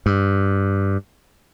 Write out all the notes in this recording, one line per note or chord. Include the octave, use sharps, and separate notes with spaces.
G2